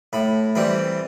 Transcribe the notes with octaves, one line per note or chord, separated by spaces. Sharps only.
A2 B5
E3 G3 C4 B5